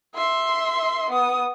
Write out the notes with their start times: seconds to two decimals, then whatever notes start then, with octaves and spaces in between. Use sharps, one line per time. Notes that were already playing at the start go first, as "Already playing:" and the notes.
0.15 E5 C6
1.10 B3 D#6